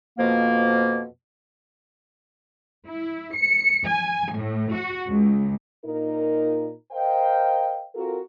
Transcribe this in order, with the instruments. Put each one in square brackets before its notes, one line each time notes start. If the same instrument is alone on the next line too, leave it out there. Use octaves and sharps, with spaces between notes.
[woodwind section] F2 B2 F3 A#3
[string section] E4
C#7
G#5
A2
F#4
C#2
[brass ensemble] A#2 D#4 A#4
A#4 C5 D#5 F5 G5
C4 F4 F#4 A4 A#4